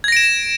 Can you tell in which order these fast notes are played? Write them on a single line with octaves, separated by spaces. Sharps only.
G#6 A#6 D7 E7